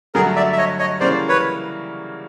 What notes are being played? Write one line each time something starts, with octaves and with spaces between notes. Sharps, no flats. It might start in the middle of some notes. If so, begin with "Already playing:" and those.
G2 D3 F#3 A3 G#4 A#4
D5 E5
E5
C#5 D#5
C#5 D#5
C#3 E3 G3 A#3 C#4 C5 D5
B4 C#5